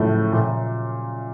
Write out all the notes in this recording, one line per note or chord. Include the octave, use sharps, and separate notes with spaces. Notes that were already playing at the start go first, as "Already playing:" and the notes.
Already playing: F#2 A2 C#3 F3 A3
A#2 A#3